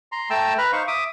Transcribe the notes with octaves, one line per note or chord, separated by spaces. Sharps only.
A#5 C6
A3 G5 A5 A#5 E6
B4 A#5 B5 F6
D#4 C5 F5 C#6
E5 D6 D#6